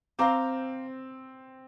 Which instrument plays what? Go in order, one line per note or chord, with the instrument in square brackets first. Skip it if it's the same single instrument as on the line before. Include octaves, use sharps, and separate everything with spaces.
[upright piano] C4 [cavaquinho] C5 F5 A#5 D6